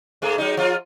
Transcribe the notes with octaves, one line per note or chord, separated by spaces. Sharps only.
G#2 A3 G#4
F#3 G#3 D#4
F3 F4